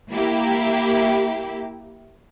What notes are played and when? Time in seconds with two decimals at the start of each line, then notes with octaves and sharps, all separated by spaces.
0.12 A#3 E4 G4